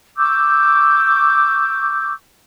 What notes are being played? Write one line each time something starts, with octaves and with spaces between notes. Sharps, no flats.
C#6 D6 E6 G6